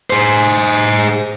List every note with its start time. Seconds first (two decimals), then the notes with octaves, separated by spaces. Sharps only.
0.10 G#4 C5